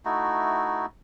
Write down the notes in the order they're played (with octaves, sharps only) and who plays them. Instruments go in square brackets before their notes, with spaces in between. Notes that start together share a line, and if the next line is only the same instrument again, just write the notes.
[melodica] A3 D#4 E4 F#4